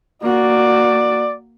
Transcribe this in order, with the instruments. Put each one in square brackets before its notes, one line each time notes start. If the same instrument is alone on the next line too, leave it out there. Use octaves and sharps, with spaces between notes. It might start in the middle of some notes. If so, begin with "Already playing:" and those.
[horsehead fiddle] A#3 F#4 [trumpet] D5